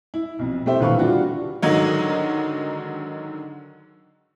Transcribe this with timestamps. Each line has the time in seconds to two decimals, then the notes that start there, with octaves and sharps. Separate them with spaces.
0.14 E4
0.39 B1 F2
0.66 A3 C4 G4 C5 E5
0.80 D#1 D3 E3 B4 F5 C#6
0.99 G3 D4 F4 F#4
1.62 G#2 D3 D#3 F#3 D#4